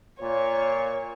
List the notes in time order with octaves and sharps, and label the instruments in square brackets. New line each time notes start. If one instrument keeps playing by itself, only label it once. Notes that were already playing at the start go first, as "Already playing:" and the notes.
[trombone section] A#2 [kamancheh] C#5